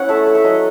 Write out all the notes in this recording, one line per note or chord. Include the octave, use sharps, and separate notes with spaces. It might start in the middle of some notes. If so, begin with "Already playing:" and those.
Already playing: C#4 E4 F#5
A3 E5
A3
E5
F#3 D#5